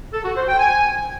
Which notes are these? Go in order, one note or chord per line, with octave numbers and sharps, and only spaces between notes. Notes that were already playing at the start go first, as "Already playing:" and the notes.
A4
F#4
C5
G5
G#5